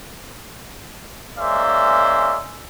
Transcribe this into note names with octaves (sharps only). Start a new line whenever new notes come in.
G#3 A#3 C#4 C5 D5 E5